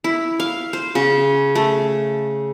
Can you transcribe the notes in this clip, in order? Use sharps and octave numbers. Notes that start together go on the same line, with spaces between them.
E4
F5
C5
C#3
A3